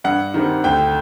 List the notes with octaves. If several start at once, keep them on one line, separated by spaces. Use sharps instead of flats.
G2 F#5
D#3 G3 C4
D2 G5